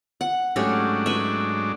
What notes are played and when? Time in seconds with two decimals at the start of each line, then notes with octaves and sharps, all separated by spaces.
0.21 F#5
0.56 G#2 F#3 A3 C#4 D4 G4
1.06 B4 E5